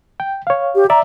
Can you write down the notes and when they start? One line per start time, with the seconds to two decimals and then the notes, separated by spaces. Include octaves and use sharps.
0.20 G5
0.47 C#5 F5
0.75 G4
0.90 D5 E5 A#5